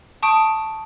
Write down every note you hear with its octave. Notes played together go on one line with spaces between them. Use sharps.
A5 C#6 D#6 D7